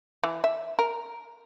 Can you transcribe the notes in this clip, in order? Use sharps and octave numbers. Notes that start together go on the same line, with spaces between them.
E3
E5
A#4